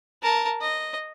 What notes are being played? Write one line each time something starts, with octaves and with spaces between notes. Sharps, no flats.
A#4 A5
D#5